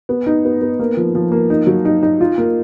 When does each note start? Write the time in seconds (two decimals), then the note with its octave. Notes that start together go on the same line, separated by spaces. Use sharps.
0.09 B3
0.26 D#4
0.45 B3
0.61 B3
0.79 A#3
0.97 F3
1.15 F3
1.32 A#3
1.50 D#4
1.67 F#3
1.85 D#4
2.03 D#4
2.21 F4
2.38 A#3